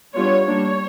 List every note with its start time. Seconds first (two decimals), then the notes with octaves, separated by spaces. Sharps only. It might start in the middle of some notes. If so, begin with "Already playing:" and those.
0.16 G3 B3 D4 F4 C#5
0.47 G3 A#3 D4 C#5